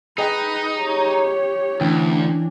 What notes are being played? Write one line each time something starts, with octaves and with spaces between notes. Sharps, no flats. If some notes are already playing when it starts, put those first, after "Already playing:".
D#4 G#4 B4 D#5 G5
G4 C#5
D2 E3 C#4 D4 G5